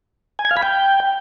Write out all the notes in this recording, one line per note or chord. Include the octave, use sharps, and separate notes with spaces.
G#5
G#6
F5
B5
G5